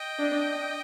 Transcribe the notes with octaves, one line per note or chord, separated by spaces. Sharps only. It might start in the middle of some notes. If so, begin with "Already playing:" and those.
Already playing: D#5 G5
D4